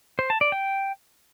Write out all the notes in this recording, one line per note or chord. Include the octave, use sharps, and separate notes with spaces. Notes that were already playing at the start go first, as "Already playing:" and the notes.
C5
A5
D5
G5